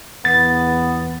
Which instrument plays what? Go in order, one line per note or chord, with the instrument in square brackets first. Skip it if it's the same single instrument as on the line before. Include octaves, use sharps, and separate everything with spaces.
[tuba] E2 [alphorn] B3 [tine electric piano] A6